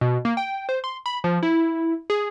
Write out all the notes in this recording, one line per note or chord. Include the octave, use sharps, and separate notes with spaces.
B2
A#3
G5
C5
C6
B5
F3
E4
G#4